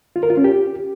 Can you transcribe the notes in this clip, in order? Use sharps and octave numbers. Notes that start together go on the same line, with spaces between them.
F4
A#4
F4
C#4
G4